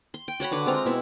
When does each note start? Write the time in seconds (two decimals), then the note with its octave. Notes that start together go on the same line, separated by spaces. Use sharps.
0.14 C6
0.28 G5
0.40 F#4 C#5 F#5 B5
0.51 D3 B4 F#5 D6
0.66 G#3 C4 F4 A#5
0.86 B2 E4 E5